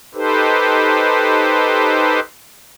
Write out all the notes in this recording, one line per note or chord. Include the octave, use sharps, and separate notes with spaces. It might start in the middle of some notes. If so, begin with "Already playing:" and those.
D#4 G4 A4 B4 C5